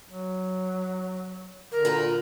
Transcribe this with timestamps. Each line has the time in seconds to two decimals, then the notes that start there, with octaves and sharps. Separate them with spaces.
0.06 F#3
1.72 D3 A#4
1.85 A#2 B4 A#5